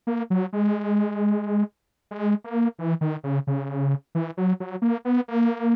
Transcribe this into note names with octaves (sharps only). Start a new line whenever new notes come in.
A#3
F#3
G#3
G#3
A#3
E3
D#3
C#3
C#3
E3
F#3
F#3
A#3
B3
A#3